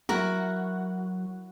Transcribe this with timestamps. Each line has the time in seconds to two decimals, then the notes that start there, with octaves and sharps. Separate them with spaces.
0.09 F#3 E4 F#4 A#4